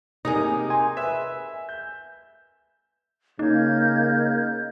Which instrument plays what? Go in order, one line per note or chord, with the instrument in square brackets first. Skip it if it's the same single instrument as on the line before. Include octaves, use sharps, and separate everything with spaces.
[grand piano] C3 A#3 [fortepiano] D#4 [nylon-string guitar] G#4 A#4 D#5
[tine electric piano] G#5 [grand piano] C6
[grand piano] B4 [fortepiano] E5
[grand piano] G6
[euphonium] C#3 [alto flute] A#3 [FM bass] D#4 [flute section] D#5 G6 G#6